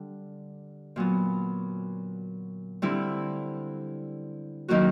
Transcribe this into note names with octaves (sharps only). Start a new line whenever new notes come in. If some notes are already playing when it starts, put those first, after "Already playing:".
Already playing: D3 G3 D4
A#2 F#3 B3
D3 G3 C4 E4
D#3 F#3 A#3 C#4 F#4